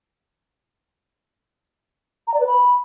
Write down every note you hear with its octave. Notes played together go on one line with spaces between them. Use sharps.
A#5
D5
B4
B5